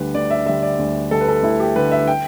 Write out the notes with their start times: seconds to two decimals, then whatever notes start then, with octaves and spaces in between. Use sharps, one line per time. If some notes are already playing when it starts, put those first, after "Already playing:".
Already playing: D2 D3 G3 B4
0.15 D2 D5
0.30 E5
0.46 D3 G3 E5
0.63 D5
0.79 D2
1.11 D3 G3 A4
1.21 B4
1.28 A4
1.43 D2 E4
1.60 G4
1.76 D3 G3 B4
1.92 E5
2.07 G5